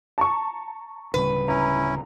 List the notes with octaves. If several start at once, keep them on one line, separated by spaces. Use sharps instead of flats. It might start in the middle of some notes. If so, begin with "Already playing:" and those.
A5 A#5 C#6
D1 C#3 G3 B4
C#4 E4 A#5